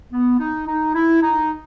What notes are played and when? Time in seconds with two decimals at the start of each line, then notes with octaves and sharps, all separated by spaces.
0.12 B3
0.39 D#4
0.67 D#4
0.94 E4
1.22 D#4